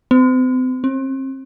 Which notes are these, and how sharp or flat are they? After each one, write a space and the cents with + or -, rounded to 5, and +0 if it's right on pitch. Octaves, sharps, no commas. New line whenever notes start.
C4 -40
C4 +35